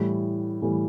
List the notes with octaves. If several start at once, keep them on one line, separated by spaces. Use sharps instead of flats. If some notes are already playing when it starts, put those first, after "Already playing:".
Already playing: A2 E3 G3
A2 E3 G3